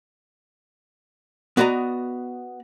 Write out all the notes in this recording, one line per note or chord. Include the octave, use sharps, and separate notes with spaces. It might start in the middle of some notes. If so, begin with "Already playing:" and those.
B3 F#4 D5 D#5 A#5